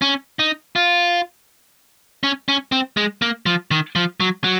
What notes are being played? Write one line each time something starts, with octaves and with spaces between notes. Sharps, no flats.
C#4
D#4
F4
C#4
C#4
C4
G#3
A#3
F3
D#3
F3
F#3
F#3